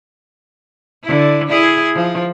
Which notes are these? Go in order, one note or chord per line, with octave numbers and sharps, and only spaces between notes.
D3 E4
E4 G#4
F3